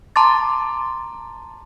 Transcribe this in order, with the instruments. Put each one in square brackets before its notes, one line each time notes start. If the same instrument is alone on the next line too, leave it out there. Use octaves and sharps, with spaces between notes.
[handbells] A5 A#5 C6 D6 A6